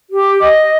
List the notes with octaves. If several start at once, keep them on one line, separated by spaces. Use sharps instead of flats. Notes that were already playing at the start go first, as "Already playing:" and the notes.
G4
D#5